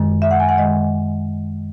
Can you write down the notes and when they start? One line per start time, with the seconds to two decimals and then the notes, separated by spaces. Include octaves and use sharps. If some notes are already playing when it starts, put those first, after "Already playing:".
Already playing: F#2 D#3 G#3
0.22 E5
0.31 F#5
0.40 G#5
0.49 F#5
0.58 F#2 D#3 G#3 D#5